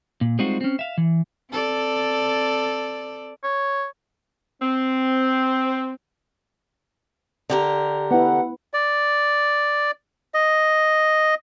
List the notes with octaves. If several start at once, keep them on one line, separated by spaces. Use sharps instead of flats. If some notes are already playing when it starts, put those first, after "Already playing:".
A#2
G3 G#3 C4 D#4 F4 F#4
C4 C#4
E5 F5
E3
C4 A4 D5
C#5
C4
D3 G4 A#4
B3 E4 F#5
D5
D#5